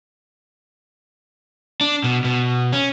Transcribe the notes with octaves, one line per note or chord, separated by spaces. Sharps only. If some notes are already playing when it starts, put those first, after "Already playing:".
D4
B2
B2
C#4